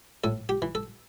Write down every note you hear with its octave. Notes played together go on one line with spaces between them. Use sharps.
A2 A4
G4
E3
A4